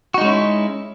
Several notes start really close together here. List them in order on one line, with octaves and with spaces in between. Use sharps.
F#4 D#4 G#3 C#4 E4